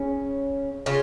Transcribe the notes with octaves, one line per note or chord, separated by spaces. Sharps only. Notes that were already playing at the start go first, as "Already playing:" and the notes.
Already playing: C#3 C#4
C#3 C#4 F4